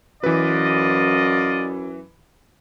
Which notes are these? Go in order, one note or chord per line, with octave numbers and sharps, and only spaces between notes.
F#2 E3 F4 B4 D5 D#5